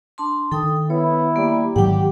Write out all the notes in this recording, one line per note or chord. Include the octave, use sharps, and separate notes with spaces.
D4 A5 C6
D#3 A4 G5 D#6
B3 E4 C#5
G3 A#3
G#2 D#3 F#3 G4 F#5 G5